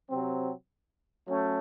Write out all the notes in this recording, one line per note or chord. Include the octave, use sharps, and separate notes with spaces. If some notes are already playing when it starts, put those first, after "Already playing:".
C3 F#3 C4
F#3 A3 C#4